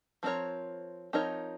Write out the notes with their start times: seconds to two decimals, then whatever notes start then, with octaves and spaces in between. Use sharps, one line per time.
0.23 F3 C4 D#4 A#4 C#5
1.13 F3 C4 D#4 A#4 C#5